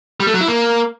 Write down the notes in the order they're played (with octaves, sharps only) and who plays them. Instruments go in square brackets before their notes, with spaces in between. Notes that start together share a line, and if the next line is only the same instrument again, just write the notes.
[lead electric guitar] G3
A3
F#3
E4
A#3